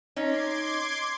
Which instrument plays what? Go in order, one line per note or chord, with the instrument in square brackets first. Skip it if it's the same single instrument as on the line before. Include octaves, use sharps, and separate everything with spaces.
[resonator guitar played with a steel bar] C#4 D#4 [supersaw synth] C6 D6 G#6